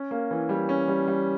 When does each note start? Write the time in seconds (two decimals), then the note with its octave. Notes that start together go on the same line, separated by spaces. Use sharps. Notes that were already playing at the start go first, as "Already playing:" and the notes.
Already playing: C#4
0.11 A#3
0.31 E3
0.49 G3
0.69 C#4
0.88 G3
1.07 G3